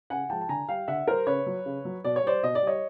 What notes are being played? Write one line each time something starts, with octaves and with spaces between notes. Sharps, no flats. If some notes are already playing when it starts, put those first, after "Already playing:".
C#3 F#5 G#5
F3 G#3 G5 A5
A5
D3 G#5 A#5
G3 F5 G5
D3 E5 F#5
G3 A#4 C5
C#3 B4 C#5
F#3
C#3
F#3
B2 D5
C#5
G3 C5 D5
B2 D#5
D5
G3 C#5 D#5